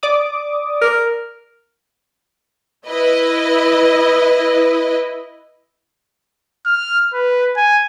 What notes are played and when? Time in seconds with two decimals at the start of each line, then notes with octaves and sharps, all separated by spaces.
0.03 D5 D6 D#6
0.82 A#4
2.87 E4 B4 D#5
6.66 F6
7.14 B4
7.57 G#5